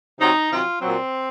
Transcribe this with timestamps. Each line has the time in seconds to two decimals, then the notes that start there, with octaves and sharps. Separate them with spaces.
0.19 C3 F#3 D#4
0.49 C3 D#3 F#3 F4
0.81 A#2 F#3 C4